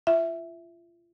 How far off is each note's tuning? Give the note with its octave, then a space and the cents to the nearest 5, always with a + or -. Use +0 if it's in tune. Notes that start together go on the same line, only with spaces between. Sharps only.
F4 -30 E5 +0